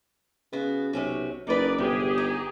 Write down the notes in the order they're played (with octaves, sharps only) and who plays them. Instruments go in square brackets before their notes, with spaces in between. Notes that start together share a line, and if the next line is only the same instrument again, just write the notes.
[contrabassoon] C#3 [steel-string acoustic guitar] B3 F#4
[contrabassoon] B1 [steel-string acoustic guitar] C3 C#4 F#4
[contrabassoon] F#1 [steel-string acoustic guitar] D#4 B4 [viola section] D5
[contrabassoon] G1 [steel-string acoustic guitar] C3 [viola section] G4 G#4
[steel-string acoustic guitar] D#4